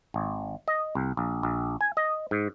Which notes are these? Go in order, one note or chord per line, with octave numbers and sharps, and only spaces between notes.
G#1
D#5
C2
A#1
A#1
G#5
D#5
G#2